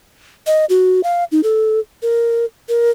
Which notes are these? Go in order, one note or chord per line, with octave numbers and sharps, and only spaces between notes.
D#5
F#4
F5
D#4
A4
A#4
A#4